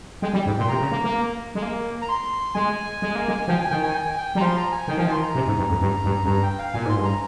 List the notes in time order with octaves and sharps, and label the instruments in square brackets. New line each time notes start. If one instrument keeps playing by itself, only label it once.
[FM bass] G#3 [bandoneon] G5
[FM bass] G3
G#2
A#2
[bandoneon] C6
[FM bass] C3 [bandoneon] A#5
[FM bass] C#3
A#3
A#3
G#3
A#3
[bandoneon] A#5
C6
[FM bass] G#3 [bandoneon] G#5
[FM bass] G#3
A#3
G#3
[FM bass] F3 [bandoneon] G5
[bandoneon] G#5
[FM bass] D#3 [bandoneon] G5
[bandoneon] G#5
G5
G#5
G5
[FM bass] G3 [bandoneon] A#5
[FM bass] F3 [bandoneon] C6
[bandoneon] A#5
G#5
[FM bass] D#3 [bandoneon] G5
[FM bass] F3 [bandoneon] G#5
[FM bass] D#3
[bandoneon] C6
A#5
[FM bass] C3
G#2
G2
F2
G2
G2
F2
[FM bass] G2 [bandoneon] A#5
[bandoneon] G5
F5
[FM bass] A#2 [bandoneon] G#5
[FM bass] G#2 [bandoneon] C6
[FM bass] G2
[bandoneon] A#5